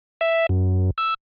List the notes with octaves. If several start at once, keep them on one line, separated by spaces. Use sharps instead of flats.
E5
F#2
E6